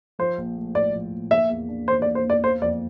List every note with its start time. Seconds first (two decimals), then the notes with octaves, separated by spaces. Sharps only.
0.19 F3 C5
0.38 A#1
0.56 A3
0.75 A2 D5
0.94 F3
1.12 A#1
1.31 A#3 E5
1.50 E2
1.69 D4
1.88 E3 C5
2.02 D5
2.06 A#3
2.15 C5
2.25 E2 D5
2.44 A#3 C5
2.62 F2 D5